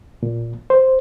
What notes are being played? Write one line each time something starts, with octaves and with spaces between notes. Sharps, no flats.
A#2
C5